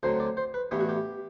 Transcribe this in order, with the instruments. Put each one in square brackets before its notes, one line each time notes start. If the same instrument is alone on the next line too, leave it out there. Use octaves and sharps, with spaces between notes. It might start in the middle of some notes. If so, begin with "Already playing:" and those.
[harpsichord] D2 D3 F#3 C4 C5
D5
C5
B4
A1 G2 E3 B3 G4
F#4
G4